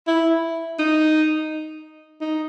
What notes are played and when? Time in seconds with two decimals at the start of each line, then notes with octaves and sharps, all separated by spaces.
0.07 E4
0.79 D#4
2.21 D#4